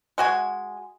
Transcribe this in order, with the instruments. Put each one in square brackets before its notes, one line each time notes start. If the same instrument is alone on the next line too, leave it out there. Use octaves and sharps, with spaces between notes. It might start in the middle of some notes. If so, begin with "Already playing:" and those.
[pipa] G#3 F#4 G#5